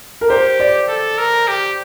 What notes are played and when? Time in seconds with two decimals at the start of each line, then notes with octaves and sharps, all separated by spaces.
0.21 A#4
0.29 G4 C5
0.60 D5
0.88 A4
1.18 A#4
1.48 G4